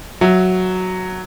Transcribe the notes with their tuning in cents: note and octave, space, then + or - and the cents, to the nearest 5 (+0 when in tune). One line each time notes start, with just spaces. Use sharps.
F#3 +0 E5 +0